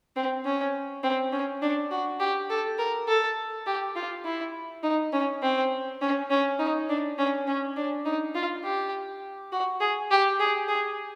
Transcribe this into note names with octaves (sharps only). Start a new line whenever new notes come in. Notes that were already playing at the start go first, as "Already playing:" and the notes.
C4
C#4
C4
C#4
D4
F#4
G4
A4
A#4
A4
G4
F4
E4
D#4
C#4
C4
C#4
C#4
D#4
D4
C#4
C#4
D4
D#4
F4
G4
F#4
G#4
G4
G#4
G#4